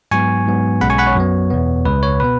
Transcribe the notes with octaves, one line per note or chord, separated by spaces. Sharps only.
G#2 F#3 B3 G#5 C#6
G#2 F#3 B3
B1 B2 G#3 C#4 F#5 B5
G#5 C#6
F#5 B5
C#5
F#2 F#3 B3
E2 B2 B3
C#2 C#3 G#3 B4
C#5
B2 B3 B4